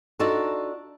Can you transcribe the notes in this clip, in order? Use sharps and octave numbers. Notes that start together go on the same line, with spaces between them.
D4 D#4 F4 F#4 A4 D5